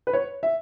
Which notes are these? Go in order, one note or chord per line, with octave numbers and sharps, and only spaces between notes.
B4
C#5
E5